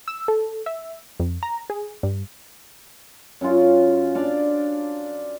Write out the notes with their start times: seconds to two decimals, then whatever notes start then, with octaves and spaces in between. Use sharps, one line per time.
0.08 E6
0.28 A4
0.66 E5
1.20 F2
1.43 A#5
1.70 G#4
2.03 G2
3.41 F#2 C#4 F4 A#4
4.15 D4 D5 F5